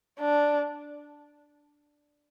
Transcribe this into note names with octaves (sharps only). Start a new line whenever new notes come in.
D4